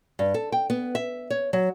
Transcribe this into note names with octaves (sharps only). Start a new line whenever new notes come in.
G2
A4
G5
B3
E5
C#5
F#3